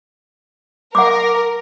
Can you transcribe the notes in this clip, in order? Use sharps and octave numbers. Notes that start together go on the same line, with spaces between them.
A#4 F#5 D6